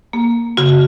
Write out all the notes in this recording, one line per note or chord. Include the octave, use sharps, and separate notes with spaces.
A#3
C#3 F#4